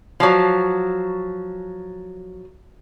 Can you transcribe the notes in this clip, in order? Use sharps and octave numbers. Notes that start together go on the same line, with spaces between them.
F3 F#3